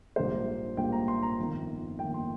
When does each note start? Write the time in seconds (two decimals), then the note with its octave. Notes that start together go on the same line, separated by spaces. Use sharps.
0.16 A#1 G#2 G3 A#3 C5
0.77 A#1 G#2 G3 A#3 G5
0.92 A#5
1.08 C6
1.23 A#5
1.38 G1 F2 D#3 A#3
1.99 G1 F2 D#3 A#3 G5
2.14 C6